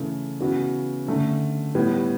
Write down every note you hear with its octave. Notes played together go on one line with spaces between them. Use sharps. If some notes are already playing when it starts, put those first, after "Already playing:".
Already playing: C#3 E3 A3
C#3 E3 B3 F#4
D3 A3 C#4
A2 G3 B3